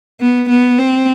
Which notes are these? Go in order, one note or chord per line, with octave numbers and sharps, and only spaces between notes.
B3
B3
C4